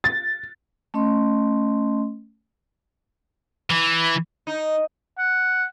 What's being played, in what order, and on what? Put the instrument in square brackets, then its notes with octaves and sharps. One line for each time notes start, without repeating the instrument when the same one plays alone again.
[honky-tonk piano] A6
[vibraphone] A3 C#4 D#5 C6
[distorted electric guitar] E3
[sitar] D#4
[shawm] F#5